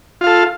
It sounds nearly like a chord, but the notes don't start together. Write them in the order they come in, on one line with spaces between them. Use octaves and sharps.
F4 F5 A4